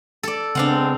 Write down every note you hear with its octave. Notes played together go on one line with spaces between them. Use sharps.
A4 D5
C#3 G#3 B3 C4 D4 F5 F#5